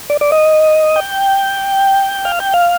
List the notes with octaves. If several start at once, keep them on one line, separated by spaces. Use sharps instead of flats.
D5
D5
D#5
G5
F5
G5
F5